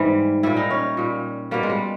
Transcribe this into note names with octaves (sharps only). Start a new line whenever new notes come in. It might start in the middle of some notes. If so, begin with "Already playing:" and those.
Already playing: G#2 E3 G3
A#2 G3 E4
D#4
C#4
A#2 G3
B2 G3 A#3
G#3
G3